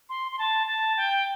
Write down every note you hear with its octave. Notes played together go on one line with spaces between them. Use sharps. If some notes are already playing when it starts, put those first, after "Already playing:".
C6
C6
A5
A5
G5